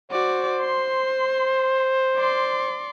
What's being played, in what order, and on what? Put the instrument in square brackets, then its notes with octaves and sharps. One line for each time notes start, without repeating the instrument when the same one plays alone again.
[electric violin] F#4 D5 [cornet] C5
[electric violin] C6
D5 C6